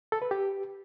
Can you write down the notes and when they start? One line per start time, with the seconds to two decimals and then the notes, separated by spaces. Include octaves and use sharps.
0.12 A4
0.22 B4
0.31 G4